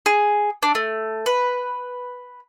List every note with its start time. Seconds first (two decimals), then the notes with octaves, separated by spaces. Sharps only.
0.06 G#4
0.63 D4
0.75 A3
1.26 B4